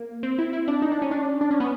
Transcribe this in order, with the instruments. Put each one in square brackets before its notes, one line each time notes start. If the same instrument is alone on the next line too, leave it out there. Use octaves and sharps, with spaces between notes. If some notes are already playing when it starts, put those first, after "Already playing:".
Already playing: [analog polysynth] A#3
C4
E4
E4
D4
D#4
D4
C#4
D4
D4
C#4
B3